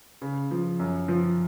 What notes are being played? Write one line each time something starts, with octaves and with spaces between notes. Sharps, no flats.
C#3
F3
F#2
F3